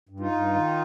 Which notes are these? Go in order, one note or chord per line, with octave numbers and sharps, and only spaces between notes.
G2
D#4 F4
G2
D#3